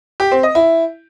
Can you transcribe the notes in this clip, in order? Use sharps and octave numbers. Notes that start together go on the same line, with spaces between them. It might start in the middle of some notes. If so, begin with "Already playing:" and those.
G4
C4
D#5
E4